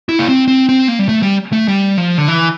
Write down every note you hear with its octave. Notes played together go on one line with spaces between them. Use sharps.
E4
A#3
C4
C4
C4
A#3
G3
A3
G3
A3
G3
F3
D3
E3